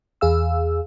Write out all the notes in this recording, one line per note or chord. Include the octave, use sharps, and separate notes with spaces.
E2 G#4 F5 E6